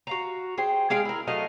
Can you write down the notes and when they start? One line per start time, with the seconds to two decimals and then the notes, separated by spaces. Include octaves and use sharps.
0.07 F#4 F5 A#5
0.58 G#4 C5 G5
0.90 G#3 G#4 F5 G5
1.05 E4 A#4
1.27 F#3 A3 D#5 F5